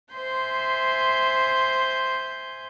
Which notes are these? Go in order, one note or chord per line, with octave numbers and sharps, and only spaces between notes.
C5 E5 G#5 C6 G6